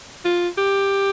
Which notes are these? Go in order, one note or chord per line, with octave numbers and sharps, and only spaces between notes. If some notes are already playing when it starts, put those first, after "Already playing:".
F4
G4